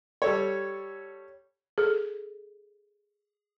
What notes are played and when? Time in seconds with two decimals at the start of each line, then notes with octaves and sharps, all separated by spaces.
0.22 G3 A4 C#5
1.78 G#4 A4